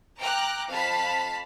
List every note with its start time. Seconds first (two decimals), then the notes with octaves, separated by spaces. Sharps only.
0.20 G5 A#5 D6 F6 F#6
0.70 F2 F5 A5 B5 B6